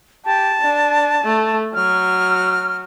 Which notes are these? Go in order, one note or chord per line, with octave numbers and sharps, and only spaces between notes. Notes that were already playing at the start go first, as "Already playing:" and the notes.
G4 A5
D4
A3
F#3 F6